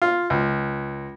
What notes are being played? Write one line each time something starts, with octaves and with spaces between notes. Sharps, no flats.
F4
C#2